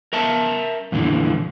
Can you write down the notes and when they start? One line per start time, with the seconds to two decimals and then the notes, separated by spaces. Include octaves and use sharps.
0.13 A#4 E5 A5
0.92 F2 A#2 D3 E3